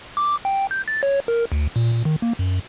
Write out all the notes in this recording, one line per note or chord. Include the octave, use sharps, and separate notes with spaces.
D6
G5
G6
A6
C#5
A#4
D2
A#2
A#2
D#3
A#3
F#2